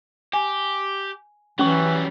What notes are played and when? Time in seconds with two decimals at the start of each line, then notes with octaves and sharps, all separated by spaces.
0.33 G4 G#5
1.59 E3 F#3 G3 C#4 C#6